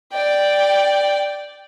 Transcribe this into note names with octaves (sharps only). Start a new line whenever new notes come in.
D5 G5